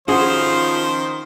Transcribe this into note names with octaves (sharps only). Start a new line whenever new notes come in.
D#3 F3 C#4 F#4 G#4 C5